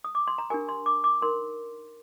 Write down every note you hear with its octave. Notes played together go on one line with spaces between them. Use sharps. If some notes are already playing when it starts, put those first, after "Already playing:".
D#6
D6
C6
A#5
D4 G4 A#4 G#5
C6
D6
D6
D#4 A#4 C6